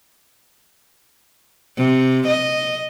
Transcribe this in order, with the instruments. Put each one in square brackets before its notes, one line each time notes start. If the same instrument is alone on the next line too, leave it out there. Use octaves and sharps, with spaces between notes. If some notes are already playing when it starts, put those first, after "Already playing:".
[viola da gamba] C3
D#5